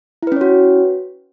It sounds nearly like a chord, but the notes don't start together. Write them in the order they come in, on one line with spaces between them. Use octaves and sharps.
E4 B4 C#4 C#5 F#4